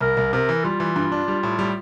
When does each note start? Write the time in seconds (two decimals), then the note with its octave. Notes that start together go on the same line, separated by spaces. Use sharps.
0.01 C2 A#4
0.17 C2
0.33 C3 A#4
0.49 E3
0.64 G3 F4
0.80 E3
0.96 G2
1.12 D4
1.28 G3
1.43 A2
1.59 G3